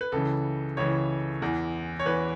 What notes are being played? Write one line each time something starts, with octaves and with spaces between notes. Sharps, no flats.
B4
C#2 C#3 E3 A4
C#2 C#3 E3 C#5
E2 E3
C#5
E2 E3 B4